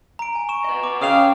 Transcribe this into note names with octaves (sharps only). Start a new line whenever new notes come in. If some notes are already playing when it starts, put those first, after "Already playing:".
A#5 D7
G#5
C#6 E7
B4 D#5
D6
C#3 F5 G5 D#6 F7